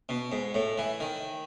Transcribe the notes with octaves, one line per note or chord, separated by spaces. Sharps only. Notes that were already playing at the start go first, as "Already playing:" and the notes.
B2
G#2
A2
E3
D#3